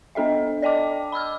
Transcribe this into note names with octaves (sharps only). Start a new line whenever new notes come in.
B3 D4 A4 D#5 E5
D5 D#5 G5 A5 D6
B5 D6 E6 F6